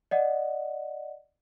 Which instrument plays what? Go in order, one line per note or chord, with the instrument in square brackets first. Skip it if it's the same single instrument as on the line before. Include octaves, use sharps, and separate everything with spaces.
[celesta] D5 D#5 F#5